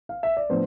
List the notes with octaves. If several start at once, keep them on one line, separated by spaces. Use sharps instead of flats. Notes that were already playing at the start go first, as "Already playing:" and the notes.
F5
E5
D5
A2 F3 B3 D4 C5